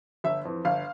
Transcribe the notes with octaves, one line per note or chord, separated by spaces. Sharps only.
G1 E5
F2 E3
G1 F5